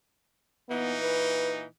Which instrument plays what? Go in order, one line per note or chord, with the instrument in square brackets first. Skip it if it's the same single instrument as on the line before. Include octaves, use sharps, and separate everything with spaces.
[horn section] A#2 E3 D#4 [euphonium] B3
[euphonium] B4